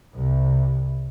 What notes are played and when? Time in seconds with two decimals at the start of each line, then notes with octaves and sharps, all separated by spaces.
0.15 C2 C3